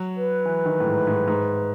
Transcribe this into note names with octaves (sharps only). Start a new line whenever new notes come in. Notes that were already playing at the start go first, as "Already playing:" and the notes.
Already playing: F#3
B4
E3
D#3
A2
G#2
G#2
G#2